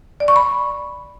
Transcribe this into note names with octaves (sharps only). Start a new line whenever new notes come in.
D5
C#6
B5